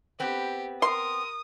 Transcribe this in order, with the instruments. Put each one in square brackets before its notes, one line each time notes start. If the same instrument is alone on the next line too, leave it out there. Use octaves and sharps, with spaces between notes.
[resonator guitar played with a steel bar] B3 C4 [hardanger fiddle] G4
[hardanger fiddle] A#4 [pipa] C6 [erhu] D#6